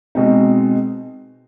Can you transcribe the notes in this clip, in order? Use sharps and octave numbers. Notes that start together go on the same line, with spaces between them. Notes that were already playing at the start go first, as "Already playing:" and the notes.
B2 G#3 C4 D#4